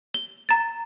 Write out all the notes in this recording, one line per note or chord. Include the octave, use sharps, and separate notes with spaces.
G7
A#5 A6